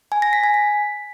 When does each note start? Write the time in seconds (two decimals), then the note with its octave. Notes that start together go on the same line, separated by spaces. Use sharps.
0.12 G#5
0.22 A#6
0.33 B6
0.44 G#5
0.54 B6